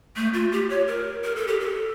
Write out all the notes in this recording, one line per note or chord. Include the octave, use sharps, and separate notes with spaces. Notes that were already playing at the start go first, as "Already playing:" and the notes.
A3
F4
G4
C#5
A#4
A#4
A4
G4
A4